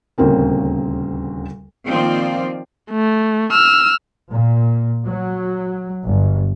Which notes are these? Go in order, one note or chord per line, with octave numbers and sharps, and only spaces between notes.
D#1 D2 C#3 A#3 C4 A#4
D#3 F3 A#3 C4 F4 D5
A3
E6 F6
A#2
F#3
G1